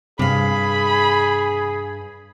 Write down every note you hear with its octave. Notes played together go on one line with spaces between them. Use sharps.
G2 C3 G#4 F5 B5